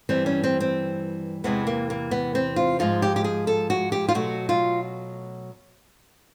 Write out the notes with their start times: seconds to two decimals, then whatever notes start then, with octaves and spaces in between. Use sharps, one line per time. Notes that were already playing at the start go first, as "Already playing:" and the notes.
0.09 G2 E3 G3 C4
0.26 C#4
0.44 C4
0.60 C4
1.44 E2 C3 E3 G#3 B3
1.67 A#3
1.90 A#3
2.11 B3
2.35 C4
2.56 F4
2.79 G#2 F3 G#3 F4
3.02 G4
3.16 G4
3.24 G#4
3.47 A4
3.70 F#4
3.92 G4
4.09 F4
4.14 B2 F#3 A3 F#4
4.49 F4